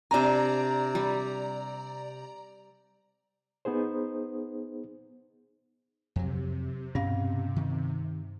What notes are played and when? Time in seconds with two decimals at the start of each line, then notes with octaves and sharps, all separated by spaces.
0.11 C3 D4 D5 G#5 A#5
0.95 G3
3.65 B3 D#4 G#4 C5
6.16 F2 C3 F#3
6.95 G2 B2 C#4 F5
7.56 D#3